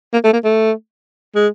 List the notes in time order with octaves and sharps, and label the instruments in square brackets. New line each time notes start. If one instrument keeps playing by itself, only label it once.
[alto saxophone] A#3
A3
A#3
A3
G#3